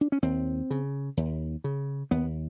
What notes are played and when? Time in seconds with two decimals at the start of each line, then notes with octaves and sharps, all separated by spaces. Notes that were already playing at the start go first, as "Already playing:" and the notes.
0.01 D4
0.12 C#4
0.22 D#2 C4
0.71 C#3
1.17 D#2
1.64 C#3
2.11 D#2 B3